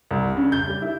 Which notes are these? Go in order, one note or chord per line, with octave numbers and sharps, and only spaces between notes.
C2
C#3
G6
G3
E4